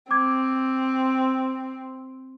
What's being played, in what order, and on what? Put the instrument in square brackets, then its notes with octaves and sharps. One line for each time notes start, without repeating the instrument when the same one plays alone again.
[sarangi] C4 [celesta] D6 G#6